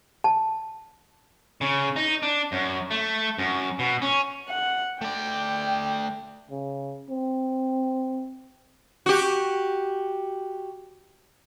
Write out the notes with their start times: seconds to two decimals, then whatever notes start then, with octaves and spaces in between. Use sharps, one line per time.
0.24 A5
1.61 C#3
1.96 D#4
2.23 D4
2.52 F#2
2.91 A3
3.38 F#2
3.79 B2
4.02 C#4
4.49 F#5
5.01 A3 D5 G5
6.51 C#3
7.10 C4
9.06 F#4 G4